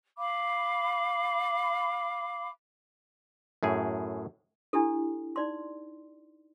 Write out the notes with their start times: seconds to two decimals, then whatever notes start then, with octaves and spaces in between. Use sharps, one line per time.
0.18 F5 B5 D6
3.63 F#2 A2 G#4
4.73 D4 E4 G4 A4
5.36 D#4 D5 C6